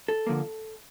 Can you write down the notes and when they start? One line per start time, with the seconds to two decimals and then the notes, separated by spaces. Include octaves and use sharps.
0.08 A4
0.27 D3 F3 A#3